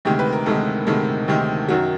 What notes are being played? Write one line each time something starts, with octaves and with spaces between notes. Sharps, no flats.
D2 C3 D#3 G#3 G4
B4
A#4
D2 C3 D#3 G#3 A4
D2 C3 D#3 G#3 A4
D2 C3 D#3 G#3 G4
F#2 D#3 F#3 F#4